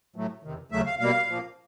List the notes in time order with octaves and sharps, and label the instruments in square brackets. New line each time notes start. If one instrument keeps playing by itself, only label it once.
[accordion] A2 F#3 A3
E2 C3 D#3
D#2 C#3 F#3 A3 E5
F5
B2 G3 A#3 F5
A#2 F3 A#3